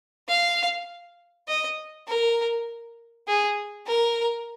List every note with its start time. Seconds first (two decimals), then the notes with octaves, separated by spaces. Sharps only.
0.28 F5
1.48 D#5
2.07 A#4
3.28 G#4
3.87 A#4